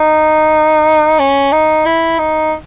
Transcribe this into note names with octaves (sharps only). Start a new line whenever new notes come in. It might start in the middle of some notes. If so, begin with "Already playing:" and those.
Already playing: D#4
C#4
D#4
E4
D#4